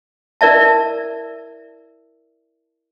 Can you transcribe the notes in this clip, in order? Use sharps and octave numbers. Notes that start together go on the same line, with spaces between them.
E4 A#4 D5 E5 A5